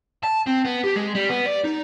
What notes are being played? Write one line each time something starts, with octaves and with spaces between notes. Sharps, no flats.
A5
C4
B3
G4
G#3
G3
B3
D5
D#4